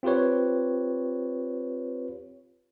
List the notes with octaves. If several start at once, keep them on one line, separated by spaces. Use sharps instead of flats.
C4 F4 G4 B4 C#5